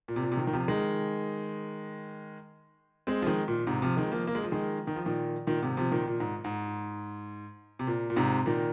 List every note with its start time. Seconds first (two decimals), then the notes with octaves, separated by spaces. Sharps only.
0.08 A#2
0.16 C3
0.22 A#2
0.32 C3
0.37 A#2 D#3
0.47 D#3
0.53 C3 F3
0.68 D#3 G#3
3.07 G#3 C4
3.22 F3
3.27 D#3 G#3
3.48 A#2
3.67 G#2 C3
3.82 C3 F3
3.97 D#3 G#3
4.12 F3 A#3
4.27 A#3
4.35 G#3
4.43 F3
4.52 D#3 G#3
4.87 D#3
4.96 F3
5.06 A#2 D#3
5.47 A#2 D#3
5.62 G#2 C3
5.77 C3 F3
5.91 A#2 D#3
6.07 A#2
6.20 G#2
6.44 G#2
7.79 C3
7.87 A#2
8.10 A#2
8.16 G#2 C3
8.46 A#2 D#3